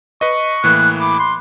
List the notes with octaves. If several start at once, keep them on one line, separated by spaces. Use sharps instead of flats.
B4 D#5 C#6
A2 E3 A#3 F#6
B5 D6
C6